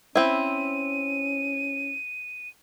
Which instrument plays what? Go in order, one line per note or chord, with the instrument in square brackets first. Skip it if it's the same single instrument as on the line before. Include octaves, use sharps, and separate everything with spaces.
[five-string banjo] C4 E4 [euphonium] C#4 [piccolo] D#7